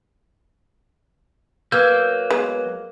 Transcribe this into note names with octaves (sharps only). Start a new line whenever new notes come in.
F#3 A#3 B4 E6 G6 G#6
G#3 B3